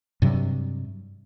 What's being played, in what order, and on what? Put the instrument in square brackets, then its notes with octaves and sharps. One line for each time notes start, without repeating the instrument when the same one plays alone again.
[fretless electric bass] G2 C3 F#3